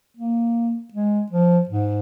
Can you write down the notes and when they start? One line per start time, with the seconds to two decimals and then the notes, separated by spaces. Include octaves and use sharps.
0.17 A#3
0.94 G#3
1.32 F3
1.69 G#2